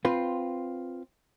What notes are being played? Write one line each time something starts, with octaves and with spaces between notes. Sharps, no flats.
C4 F4 B4